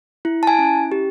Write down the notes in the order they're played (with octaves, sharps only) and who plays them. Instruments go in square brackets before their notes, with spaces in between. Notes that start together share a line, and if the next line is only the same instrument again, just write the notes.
[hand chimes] E4
A5
G#5
C#4
G4